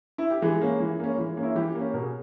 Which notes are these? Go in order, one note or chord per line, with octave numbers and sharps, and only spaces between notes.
E4
G4
E3 G#3 G#4
A#3 C#4
E3
A#3 C#4
E3
A#3 C#4
E4
E3 G4
A#3 C#4
B2 A#4
G#4